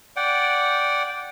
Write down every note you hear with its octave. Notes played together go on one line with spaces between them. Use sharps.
D5 F#5 G5